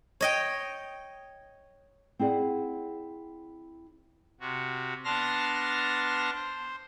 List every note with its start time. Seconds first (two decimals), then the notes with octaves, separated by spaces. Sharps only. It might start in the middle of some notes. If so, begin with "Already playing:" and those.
0.21 C#5 D#5 G5
2.19 C4 E4 G#4 D5 F#5
4.40 C3 F#4
5.05 B3 D4 A5 C6 F6 A#6
6.34 C5